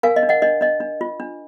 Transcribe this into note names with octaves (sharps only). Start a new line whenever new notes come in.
A#4 F5 G#5
D#5
D4
D#5 F#5
D4 D#5
D4 D#5
D4
F4
D4